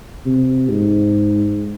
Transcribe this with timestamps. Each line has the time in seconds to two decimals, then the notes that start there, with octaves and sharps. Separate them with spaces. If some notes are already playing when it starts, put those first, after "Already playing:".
0.25 C3
0.69 G#2